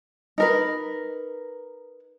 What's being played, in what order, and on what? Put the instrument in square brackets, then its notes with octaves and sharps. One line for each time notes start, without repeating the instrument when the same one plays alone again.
[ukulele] D#4 A#4 B4